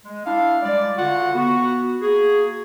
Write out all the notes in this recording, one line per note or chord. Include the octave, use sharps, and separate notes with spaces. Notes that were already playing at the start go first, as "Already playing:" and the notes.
G#3
D4 E4 F5
G3 G#3 D5
D3 F4 F#4 F#5
B3 F#4
A#3 F#4 G#4